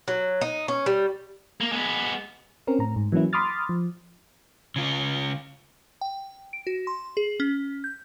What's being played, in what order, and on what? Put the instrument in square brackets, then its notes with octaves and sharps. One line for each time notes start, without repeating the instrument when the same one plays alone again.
[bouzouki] F#3
D#4
C#4
G3
[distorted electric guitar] A#3
G#3 B3
[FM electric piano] C4 C#4 A#4
A2 A#5
G#2
E3 F#3 A#3 C#4 E4
B5 C6 D6 D#6 F6 A6
F3
[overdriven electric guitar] C#3 F4
[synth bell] G5
D7
F#4
C6
G#4
C#4
G6